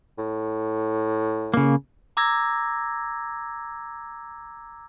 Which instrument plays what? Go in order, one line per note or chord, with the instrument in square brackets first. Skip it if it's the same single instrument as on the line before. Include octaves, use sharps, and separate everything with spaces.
[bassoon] A2
[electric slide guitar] C#3 A#3
[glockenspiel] A#5 D6 E6 G#6 A#6